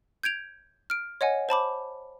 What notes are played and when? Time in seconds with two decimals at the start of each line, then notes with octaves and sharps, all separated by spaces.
0.23 G6 G#6 D7 F7
0.90 F6 D7
1.21 C#5 D#5 F#5 G#5
1.49 C5 A5 B5 D6